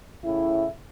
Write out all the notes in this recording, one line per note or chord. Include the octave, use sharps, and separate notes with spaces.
A2 C#3 E4